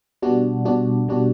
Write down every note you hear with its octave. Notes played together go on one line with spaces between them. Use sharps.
B2 G3 D4 F#4
B2 G3 D4 F#4
B2 G3 D4 F#4